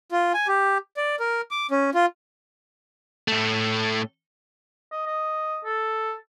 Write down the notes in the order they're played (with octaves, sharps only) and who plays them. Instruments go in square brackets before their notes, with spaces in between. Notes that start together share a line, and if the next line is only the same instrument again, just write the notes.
[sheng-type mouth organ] F4
G#5
G4
D5
A#4
D6
C#4
F4
[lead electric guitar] A2 A3
[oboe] D#5
D#5
A4